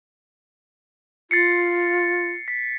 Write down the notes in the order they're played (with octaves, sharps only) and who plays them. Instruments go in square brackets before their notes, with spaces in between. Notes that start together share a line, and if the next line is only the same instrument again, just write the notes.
[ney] F4 [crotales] A6 C7 C#7
[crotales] B6